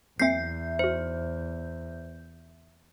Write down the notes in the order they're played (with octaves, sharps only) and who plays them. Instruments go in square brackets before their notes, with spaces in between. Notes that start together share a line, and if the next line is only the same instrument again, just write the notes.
[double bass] E2 [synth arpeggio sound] F#3 A#3 C4 [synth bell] E5 G6 [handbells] C7
[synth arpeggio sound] D#4 F#4 [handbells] C5